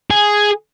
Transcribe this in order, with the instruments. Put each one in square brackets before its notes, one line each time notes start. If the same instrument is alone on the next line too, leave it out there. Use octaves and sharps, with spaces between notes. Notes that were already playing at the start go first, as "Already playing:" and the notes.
[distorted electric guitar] G#4